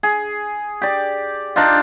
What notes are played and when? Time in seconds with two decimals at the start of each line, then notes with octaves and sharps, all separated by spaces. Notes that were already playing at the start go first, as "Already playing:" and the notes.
0.03 G#4
0.82 G4 D5
1.56 D4 D#4 F4